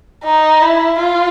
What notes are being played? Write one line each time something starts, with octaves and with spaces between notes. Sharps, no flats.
D#4
E4
F4